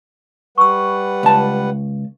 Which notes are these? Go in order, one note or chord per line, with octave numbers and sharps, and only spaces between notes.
G3 B4 F#5 C#6 E6
C#2 A5